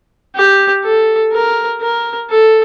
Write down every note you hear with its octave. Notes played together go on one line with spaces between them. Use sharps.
G4
A4
A#4
A#4
A4